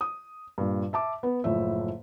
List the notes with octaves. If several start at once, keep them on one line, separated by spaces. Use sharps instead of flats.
D#6
G2 A#2
E5 A5 D6
B3 B4
F#1 A2 F3 E5